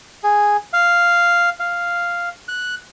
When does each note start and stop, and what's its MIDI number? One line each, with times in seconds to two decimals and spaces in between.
0.24 0.57 68
0.73 1.49 77
1.60 2.29 77
2.48 2.75 90